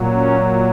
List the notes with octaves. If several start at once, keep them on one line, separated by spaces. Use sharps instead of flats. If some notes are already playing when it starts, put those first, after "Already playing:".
Already playing: A#2 F#3
C#4